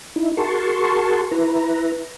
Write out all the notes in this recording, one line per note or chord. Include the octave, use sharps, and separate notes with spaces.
D#4 E4
F#4 G#4 A#4 A5 C6 C#6
E4 B4 A#5